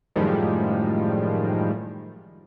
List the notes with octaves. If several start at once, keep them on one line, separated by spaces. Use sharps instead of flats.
F#2 A2 D#3 F3 G3 G#3